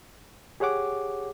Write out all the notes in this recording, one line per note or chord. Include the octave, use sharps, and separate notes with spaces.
G4 G#4 C#5 F#5 D6